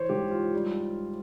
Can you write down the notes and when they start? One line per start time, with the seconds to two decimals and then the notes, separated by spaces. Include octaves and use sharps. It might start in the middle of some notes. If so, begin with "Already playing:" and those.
Already playing: E3 C5 C#5
0.09 G#2 G4
0.31 F4
0.54 G3